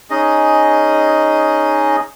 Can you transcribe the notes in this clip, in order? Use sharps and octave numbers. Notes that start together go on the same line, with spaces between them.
C#4 D#4 G#4 D#5